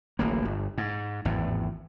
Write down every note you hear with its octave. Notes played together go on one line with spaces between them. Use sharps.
D1 A1 A#3
G1
G#2
G#1 E2 A2